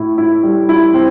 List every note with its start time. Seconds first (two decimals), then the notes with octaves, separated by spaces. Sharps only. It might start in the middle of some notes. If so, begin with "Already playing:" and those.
Already playing: A2 E4
0.18 E4
0.43 G3
0.69 E4
0.94 C4